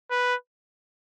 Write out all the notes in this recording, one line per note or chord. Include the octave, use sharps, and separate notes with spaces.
B4